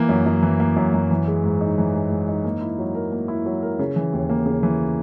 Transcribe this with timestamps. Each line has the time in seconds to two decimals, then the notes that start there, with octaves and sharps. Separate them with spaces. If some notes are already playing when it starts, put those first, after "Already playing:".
Already playing: E3 A#3
0.09 F#2
0.26 F#2
0.43 E3
0.60 A#3
0.76 F#2
0.94 F#2
1.10 E3
1.28 G#3
1.44 G#2
1.61 D#4
1.78 E3
1.95 G#3
2.10 G#2
2.28 D#4
2.44 A#3
2.61 E4
2.79 F#3
2.95 A#4
3.12 A#3
3.28 E4
3.46 F#3
3.63 A#4
3.79 C#3
3.96 E3
4.13 D#2
4.29 A#3
4.46 C#3
4.63 E3